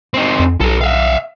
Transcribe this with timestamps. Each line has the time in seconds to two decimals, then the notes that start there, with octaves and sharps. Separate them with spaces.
0.14 C4 D#4
0.40 F2
0.61 B1 A4 B4
0.81 E5 F5